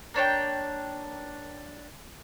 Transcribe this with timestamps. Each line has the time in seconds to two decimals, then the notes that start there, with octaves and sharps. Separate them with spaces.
0.14 A#3 D4 C#5 G5